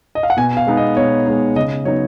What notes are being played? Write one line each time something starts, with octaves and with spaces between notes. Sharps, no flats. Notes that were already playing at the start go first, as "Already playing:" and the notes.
D#5
F5
F#5
B2 G#5
F5
G#3 B3 D#4
D#5
B2 C#5
G#3 B3 D#4
C#3 D#5
F#3 B3 D#4 C#5